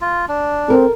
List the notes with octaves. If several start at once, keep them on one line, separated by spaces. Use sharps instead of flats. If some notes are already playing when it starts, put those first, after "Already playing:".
F4
D4
C4 A4 A#4